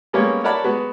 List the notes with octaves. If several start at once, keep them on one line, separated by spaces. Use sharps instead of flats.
G3 G#3 A#3 B3 C#4 C#5
A#4 C#5 D5 F#5 A5 B5
G#3 B3 F#4